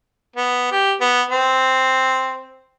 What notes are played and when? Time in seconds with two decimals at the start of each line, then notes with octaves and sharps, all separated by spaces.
0.36 B3
0.72 G4
1.01 B3
1.31 C4